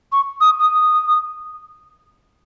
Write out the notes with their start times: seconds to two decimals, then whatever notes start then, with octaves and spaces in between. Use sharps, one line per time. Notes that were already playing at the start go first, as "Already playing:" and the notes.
0.12 C#6
0.41 D#6
0.59 D#6